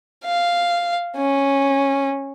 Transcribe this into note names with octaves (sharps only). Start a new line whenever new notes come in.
F5
C#4